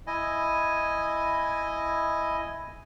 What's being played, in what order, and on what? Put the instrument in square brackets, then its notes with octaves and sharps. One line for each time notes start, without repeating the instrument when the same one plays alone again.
[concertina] E4 D#5 G#5